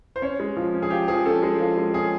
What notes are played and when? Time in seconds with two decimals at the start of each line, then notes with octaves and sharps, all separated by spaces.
0.16 C5
0.22 C#4 C#5
0.40 G#3
0.57 F3
0.74 C#4
0.82 G#4
0.90 F3 G4
1.08 F3 G#4
1.26 C#4 A4
1.43 G#3
1.60 F3 A4
1.77 G#3
1.94 C#4 G#4